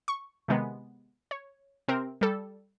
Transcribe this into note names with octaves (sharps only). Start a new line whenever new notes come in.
C#6
C3 D#3 G#3 B3
C#5
C3 C4 A#4
G3 A4